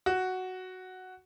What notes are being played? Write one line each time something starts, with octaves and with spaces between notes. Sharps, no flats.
F#4